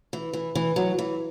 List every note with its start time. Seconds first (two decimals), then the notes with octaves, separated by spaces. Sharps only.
0.13 E3
0.33 E3
0.55 E3
0.76 F#3
0.99 E3